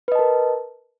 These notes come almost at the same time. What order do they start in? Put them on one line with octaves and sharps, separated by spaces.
B4 D#5 A5 A#4